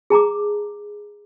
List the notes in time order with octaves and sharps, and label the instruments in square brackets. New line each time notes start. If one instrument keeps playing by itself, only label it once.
[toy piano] G#4 A5 A#5 D6